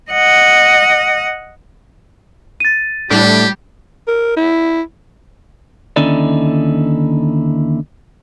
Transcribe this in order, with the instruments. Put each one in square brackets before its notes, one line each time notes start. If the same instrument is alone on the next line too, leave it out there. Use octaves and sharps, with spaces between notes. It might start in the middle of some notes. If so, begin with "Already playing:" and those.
[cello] D#5 F#5
[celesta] A6 D#7
[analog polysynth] A2 D4 [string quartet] G3 [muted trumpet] G4
[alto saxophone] A#4
E4
[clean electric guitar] D#2 D3 C#4 D#4 E4 D5